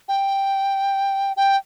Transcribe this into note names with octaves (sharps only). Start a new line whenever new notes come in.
G5
G5